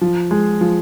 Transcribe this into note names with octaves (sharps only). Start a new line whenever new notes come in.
F3
G#3
F3